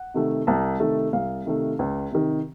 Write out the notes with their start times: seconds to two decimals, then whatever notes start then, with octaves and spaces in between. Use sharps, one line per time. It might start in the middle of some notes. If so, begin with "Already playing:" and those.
Already playing: F#5
0.14 C3 D#3 A3
0.47 C2 A5
0.80 C3 D#3 A3
1.13 C2 F5
1.46 C3 D#3 A3
1.79 C#2
2.12 C3 D#3